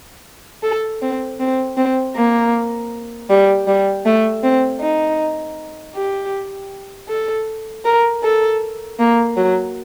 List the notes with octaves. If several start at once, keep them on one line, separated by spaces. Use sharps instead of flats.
A4
C4
C4
C4
A#3
G3
G3
A3
C4
D#4
G4
A4
A#4
A4
A#3
F#3